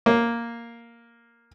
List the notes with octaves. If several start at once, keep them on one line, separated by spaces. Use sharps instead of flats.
A#3